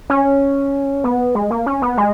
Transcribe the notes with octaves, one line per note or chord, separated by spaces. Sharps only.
C#4
B3
G#3
A#3
C#4
B3
G#3